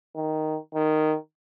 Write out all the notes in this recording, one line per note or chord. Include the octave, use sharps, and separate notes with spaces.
D#3
D#3